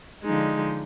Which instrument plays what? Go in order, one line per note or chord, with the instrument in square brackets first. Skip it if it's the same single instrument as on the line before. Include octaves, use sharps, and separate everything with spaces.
[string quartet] D3 F3 G#3 D#4